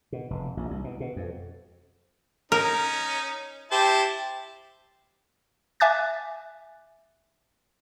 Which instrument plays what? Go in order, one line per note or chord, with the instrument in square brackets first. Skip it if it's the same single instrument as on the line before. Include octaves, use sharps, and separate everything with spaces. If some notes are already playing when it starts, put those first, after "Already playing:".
[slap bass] B2
F1
A#1
C2
B2
B2
F2
[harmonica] C#4 D#4 [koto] A#4
[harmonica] E4 C5 A5 [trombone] G4
[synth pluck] E5 G#5 D6 F#6 A6